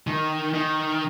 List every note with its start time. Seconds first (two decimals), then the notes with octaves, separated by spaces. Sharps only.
0.07 D#3
0.54 D#3